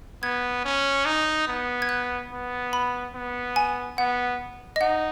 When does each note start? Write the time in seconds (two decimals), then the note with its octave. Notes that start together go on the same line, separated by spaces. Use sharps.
0.23 B3 G#6
0.65 C#4
1.05 D#4
1.47 B3
1.82 G#6
1.89 F#6
2.31 B3
2.73 B5
3.15 B3
3.56 G#5
3.98 B3 F#5
4.76 D#5
4.81 D#4 F#5